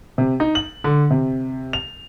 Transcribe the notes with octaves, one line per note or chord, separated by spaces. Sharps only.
C3
D#4
F#7
D3
C3
F7